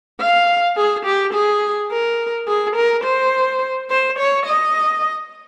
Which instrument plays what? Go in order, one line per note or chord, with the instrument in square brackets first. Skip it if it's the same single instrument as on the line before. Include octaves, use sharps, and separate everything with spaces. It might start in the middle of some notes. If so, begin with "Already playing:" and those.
[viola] F5
G#4
G4
G#4
A#4
G#4
A#4
C5
C5
C#5
D#5